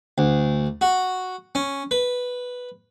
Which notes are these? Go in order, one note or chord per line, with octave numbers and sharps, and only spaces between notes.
D2
F#4
C#4
B4